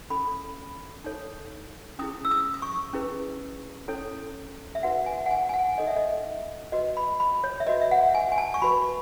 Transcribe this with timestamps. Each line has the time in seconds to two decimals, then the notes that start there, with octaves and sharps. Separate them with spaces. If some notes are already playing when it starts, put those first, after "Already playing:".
0.10 C#4 E4 A4 B5
1.04 D#4 A4 C#5
1.99 C#4 E4 G#4 D#6
2.25 E6
2.31 D#6
2.54 D#6
2.62 C#6
2.93 C#4 E4 G#4 B4
3.88 C#4 E4 A4 C#5
4.75 E5
4.83 D#4 F#4 B4 F#5
5.06 G#5
5.26 F#5
5.31 G#5
5.49 G#5
5.54 F#5
5.78 D#4 A4 C#5 D#5
5.87 E5
5.96 D#5
6.72 F#4 B4 D#5
6.97 B5
7.20 B5
7.44 C#5
7.60 E5
7.67 F#4 B4 D#5
7.82 E5
7.91 F#5
8.15 G#5
8.32 G#5
8.38 A5
8.54 C#6
8.62 F#4 B4 B5